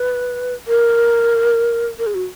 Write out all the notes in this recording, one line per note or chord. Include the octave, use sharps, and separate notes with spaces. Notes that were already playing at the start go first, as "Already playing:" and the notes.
Already playing: B4
A#4
A#4
G#4
F#4